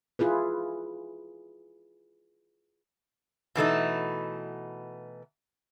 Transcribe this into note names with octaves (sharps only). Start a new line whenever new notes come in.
E4 F4 G#4 B4
B2 E3 A3 D#4